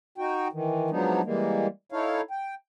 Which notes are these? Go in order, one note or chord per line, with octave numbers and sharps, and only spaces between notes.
D#4 F#4 G5
D#3 E3
F3 F#3 G#3 B3 D4 D#4
E3 G3 G#3 A#3
D#4 E4 A4 C#5 F5
G5